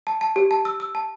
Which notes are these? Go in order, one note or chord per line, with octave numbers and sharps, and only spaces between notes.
A5
A5
G4
A5
E6
E6
A5